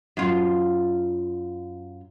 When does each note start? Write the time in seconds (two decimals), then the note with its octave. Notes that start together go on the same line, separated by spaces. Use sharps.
0.17 F#2 F4